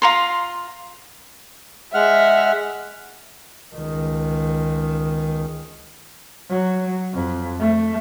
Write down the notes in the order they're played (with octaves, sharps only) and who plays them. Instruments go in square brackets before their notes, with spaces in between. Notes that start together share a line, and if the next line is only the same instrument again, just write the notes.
[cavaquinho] F4 A#5 C6
[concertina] G#3 F#5 F6 [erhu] E5
[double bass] C#2 D#3
F#3
F2
A3